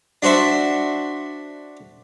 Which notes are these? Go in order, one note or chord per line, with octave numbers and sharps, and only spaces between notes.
D4 F#4 C5 E5